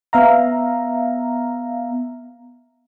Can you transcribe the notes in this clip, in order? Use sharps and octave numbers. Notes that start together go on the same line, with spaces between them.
B3 E5 F5 A#5